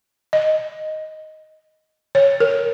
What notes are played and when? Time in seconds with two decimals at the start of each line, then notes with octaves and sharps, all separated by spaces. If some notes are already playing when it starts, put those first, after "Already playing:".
0.33 D#5
2.15 C#5
2.40 A#4